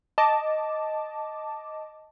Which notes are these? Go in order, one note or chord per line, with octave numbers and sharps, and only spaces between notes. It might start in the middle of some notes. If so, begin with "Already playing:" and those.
D#5 A5 D6